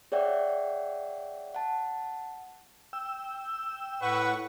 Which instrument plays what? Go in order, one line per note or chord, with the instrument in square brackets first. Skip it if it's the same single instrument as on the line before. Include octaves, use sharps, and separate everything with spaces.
[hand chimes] G#4 C#5 D5 E5 F#5 G5
F#5 A5
[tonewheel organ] G5 E6
[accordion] A2 F#5 C#6 [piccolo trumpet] B4